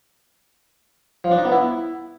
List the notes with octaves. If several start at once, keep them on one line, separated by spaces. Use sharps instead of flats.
F3
D4
D#4
B3
E4